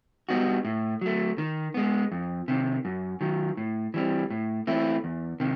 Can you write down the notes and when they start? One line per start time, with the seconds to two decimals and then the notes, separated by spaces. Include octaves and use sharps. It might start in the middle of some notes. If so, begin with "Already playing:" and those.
0.29 G3 B3 D#4 F#4
0.65 A2
1.01 F#3 A3
1.38 D#3
1.74 G#3 B3
2.12 F2
2.48 C3 D#3
2.85 F#2
3.21 D#3 F#3
3.57 A2
3.94 E3 G3 C4
4.30 A2
4.67 E3 A3 C4 E4
5.04 E2
5.40 C3 D#3